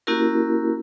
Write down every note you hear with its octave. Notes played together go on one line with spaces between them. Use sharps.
A#3 C#4 E4 F#4 G4 A#4